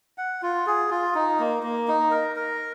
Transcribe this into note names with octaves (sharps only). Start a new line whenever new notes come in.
F#5
F4
G#4
F4
D#4
A#3
A#3
D#4
A#4
A#4